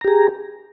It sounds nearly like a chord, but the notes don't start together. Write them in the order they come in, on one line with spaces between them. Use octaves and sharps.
A#5 G4 G#4